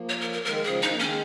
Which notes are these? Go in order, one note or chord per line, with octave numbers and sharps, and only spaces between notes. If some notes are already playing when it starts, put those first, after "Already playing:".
Already playing: F3 A#3
C#5
A#4
A#4
D#3 G#3 A#4
C#3 F3 G#4
D#3 D#4
A#3
D#3 G#3 C#4